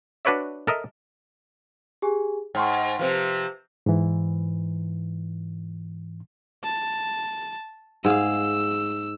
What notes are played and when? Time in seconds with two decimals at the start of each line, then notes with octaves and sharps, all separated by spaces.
0.25 D4 F#4 B4 C#5 D5 E5
0.67 A4 A#4 D#5 E5
2.02 G4 G#4 G#5
2.55 G#2 G5 C6 C#6
2.99 C3 F3 B4 C5
3.86 G#2 E3
6.64 A5
8.05 G#2 G#4 F5 E6